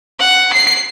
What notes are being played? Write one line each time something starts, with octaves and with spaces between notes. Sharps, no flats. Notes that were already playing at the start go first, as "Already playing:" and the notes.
F#5
C7